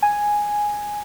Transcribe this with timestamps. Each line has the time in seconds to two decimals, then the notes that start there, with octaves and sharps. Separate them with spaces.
0.02 G#5